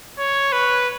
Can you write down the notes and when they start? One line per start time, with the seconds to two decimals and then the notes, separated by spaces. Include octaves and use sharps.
0.19 C#5
0.53 B4